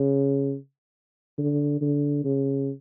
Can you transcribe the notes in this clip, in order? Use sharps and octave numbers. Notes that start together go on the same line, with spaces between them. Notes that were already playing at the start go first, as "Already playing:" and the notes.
Already playing: C#3
D3
D3
C#3